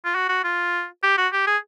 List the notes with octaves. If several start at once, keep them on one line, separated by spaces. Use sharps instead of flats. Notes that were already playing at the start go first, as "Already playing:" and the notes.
F4
F#4
F#4
F4
G4
F#4
G4
G#4